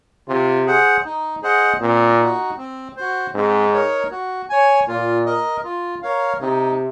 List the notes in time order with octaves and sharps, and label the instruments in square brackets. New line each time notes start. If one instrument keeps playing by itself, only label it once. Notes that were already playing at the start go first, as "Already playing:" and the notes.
[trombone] C3 [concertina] F4
[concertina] G#4 C5 F#5
D#4
G#4 C5 D#5 F#5
[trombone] A#2 [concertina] C4
[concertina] D#4
F#4
C4
F#4 C5
[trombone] G#2 [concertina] C4
[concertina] D#4 A#4 C#5
F#4
C#5 G#5
[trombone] A#2 [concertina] F4
[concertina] A#4 D#5
F4
A#4 C#5 F5
[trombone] C3 [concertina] D#4